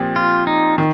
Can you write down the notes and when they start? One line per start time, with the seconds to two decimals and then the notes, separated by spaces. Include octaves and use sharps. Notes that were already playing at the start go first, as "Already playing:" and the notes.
Already playing: A#2 F3 C4 G4
0.16 F4
0.47 D#4
0.78 D#3